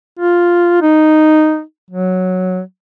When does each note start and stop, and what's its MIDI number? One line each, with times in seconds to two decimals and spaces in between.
0.19 0.79 65
0.82 1.61 63
1.90 2.61 54